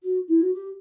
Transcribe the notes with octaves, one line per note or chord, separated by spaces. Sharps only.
F#4
E4
F#4
G4